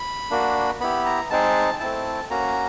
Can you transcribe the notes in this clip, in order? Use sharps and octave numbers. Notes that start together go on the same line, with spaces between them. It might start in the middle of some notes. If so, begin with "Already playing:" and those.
Already playing: B5
A#3 D4 F#4
B3 E4 G4 B5
A#5
G#3 C4 D#4 G#4 A5
A3 C4 E4 A5
A#3 C#4 F#4 A#5